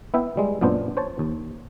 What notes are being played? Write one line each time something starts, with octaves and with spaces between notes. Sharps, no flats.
B3 E4 E5 G5
G3 G#3
F#2 A#2 B3 D4 C5
C5 C#5 A5
D#2